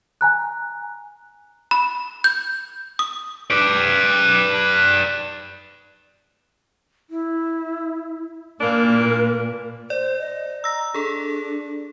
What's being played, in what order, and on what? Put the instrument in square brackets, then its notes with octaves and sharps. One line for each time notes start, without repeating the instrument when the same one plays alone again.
[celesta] G#5 A#5 F#6
[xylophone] B5
G6
D#6
[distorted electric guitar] B4 D5
[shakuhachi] E4
[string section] A#2 [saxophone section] E3 A#3 D4 [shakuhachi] A#4
[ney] C5 [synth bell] D5
[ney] D#5
[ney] A#5 [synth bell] E6 A#6
[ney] D4 [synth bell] G#4 A4